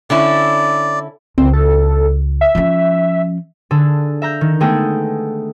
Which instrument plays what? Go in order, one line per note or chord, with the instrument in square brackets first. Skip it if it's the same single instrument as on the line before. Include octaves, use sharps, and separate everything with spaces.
[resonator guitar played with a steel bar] D3 C#4 E4 [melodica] D5
[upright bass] C#2 [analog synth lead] C4
[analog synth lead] A4
E5
[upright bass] F3 C#4
[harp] D3 G#4 A4
E5 A#5 G6
D#3
G#3 A3 B3 G#4 A4 G5